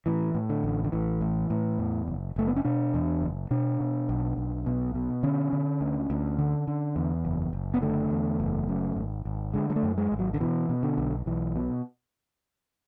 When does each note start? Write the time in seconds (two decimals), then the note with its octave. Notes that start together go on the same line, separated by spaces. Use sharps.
0.06 A2 E3
0.35 A2
0.50 D3
0.64 A1
0.84 D3
0.92 A1 E3
1.21 A2
1.50 A2
1.79 E2
2.08 F#1
2.36 F#1 A3
2.47 B3
2.56 C#4
2.65 B2 D4
2.94 E2
3.22 F#1
3.51 B2 D4
3.80 B2
4.09 B1
4.37 B1
4.66 B2
4.95 B2
5.23 D3 C#4
5.53 D3
5.81 D2
6.10 D2
6.39 D3
6.67 D3
6.96 E2
7.25 F#1
7.53 F#1
7.74 B3
7.82 D3 A3
8.11 E2
8.40 F#1
8.68 F#2
8.97 G#1
9.25 G#1
9.54 D3 G#3
9.70 G#3
9.76 A3
9.83 F#2
9.98 G#3
10.12 G#1
10.19 F#3
10.34 D3
10.40 B2 E3
10.69 B2
10.83 D3
10.98 B1
11.26 B1 E3
11.56 B2